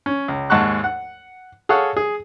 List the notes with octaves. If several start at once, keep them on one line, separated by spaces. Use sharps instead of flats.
C#4
C#2
D#2 G#2 F#5 A5 C#6 F#6
F#5
G#4 A4 C#5 F5 F#5
G#4